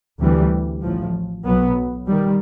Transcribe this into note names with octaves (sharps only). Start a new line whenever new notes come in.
D2 C3 E3 G3
A1 A2 F3
B1 B2 F#3 B3
D#3 G3